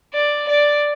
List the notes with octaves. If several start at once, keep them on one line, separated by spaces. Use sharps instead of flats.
D5
D5